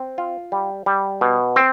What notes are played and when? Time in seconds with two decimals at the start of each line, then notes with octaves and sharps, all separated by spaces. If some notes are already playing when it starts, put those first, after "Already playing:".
Already playing: C4
0.18 F4
0.52 G3
0.86 G3
1.21 B2
1.56 C4